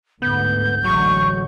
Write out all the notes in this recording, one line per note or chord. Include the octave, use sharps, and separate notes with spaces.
D2 G#2 B3 G6
A1 D2 F#3 G#3 C#6